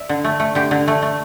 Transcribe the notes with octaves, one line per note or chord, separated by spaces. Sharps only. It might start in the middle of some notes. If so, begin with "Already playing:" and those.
Already playing: D5 E5
D3
A3
A3
D3 G4
D3
A3
A3